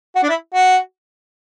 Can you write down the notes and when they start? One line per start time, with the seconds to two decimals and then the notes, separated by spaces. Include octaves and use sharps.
0.16 F#4
0.23 D4
0.29 E4
0.54 F#4